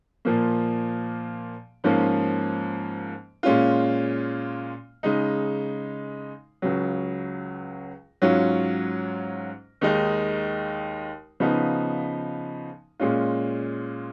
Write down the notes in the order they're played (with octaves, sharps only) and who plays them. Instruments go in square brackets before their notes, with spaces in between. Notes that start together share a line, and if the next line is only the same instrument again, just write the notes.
[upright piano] A#2 F3 A#3
G#2 F3 A#3 C#4
A#2 G#3 C#4 F4
C#3 G#3 D#4
C#2 C#3 F#3
G#2 F#3 C#4 F4
D#2 D#3 G#3 D#4
C#3 F3 B3 D#4
A#2 G#3 C#4 F4